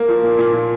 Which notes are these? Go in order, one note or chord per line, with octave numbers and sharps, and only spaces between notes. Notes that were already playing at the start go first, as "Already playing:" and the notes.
Already playing: A#3
F3
A#2
A#2
A#2